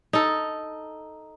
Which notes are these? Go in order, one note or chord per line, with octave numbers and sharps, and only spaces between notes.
D#4 A4